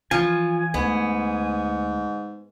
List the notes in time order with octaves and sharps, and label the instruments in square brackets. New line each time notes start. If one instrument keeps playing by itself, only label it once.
[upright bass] E3 [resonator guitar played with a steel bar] F3 [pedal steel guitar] G#5
[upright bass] D2 [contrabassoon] G#2 [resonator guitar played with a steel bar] B3